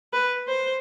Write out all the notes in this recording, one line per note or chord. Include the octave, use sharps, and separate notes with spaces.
B4
C5